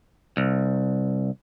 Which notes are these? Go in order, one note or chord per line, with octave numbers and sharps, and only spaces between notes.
C2